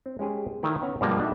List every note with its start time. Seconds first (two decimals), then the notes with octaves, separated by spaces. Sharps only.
0.06 C4
0.19 G#3 C#4 G4 G#4
0.63 D#3 A3 E4 D5
0.82 B3 C#4 F#5 A#5
1.01 G2 B2 F3 G3 G#3 A#3
1.20 D4 D#4 F#4 G4 A4 E5